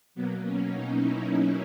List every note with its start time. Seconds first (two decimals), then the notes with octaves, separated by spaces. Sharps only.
0.15 B2 F#3 A#3 B3
0.44 C#4
0.72 D#4
1.00 E4